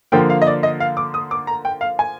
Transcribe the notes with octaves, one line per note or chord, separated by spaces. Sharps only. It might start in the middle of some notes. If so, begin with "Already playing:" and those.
D3 F3 A#3 G5
F5
D#5
D5
D#5
F5
D6
D#6
D6
A#5
G5
F5
G#5